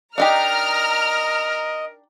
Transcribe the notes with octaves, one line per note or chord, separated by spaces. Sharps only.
D4 D#4 G4 A#4 D#5 A#5 F6